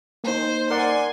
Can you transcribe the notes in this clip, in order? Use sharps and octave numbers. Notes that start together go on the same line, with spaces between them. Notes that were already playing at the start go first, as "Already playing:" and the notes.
A#3 D#4 C5
A#4 D5 F#5 G#5 C6